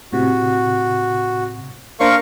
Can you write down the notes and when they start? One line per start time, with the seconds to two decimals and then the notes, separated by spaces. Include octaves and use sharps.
0.13 A2 C3 F#4
2.00 A#3 D4 A#4 C5 F5 C#6